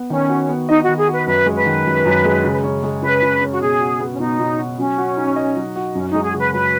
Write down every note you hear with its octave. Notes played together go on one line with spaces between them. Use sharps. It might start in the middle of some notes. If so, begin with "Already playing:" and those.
Already playing: B3
D#3 C#4
F#4
B3
D#4 D#5
F#4
D#3
G#4
F#4
B4
F#2 B4
G#3
B4
D#3
F#2
F#2
G#3
C#3
C#4
G#3
C#3 B4
C#3
C#4
F#4
B2 G#4
F#4
B3
C#4
B2 D#4
B2
F#4
F#3 C#4
F#4
D#4
D#5
F#3
F#4
F#2 C#4
G#3 D#4
G#4
C#3
B4
F#2 B4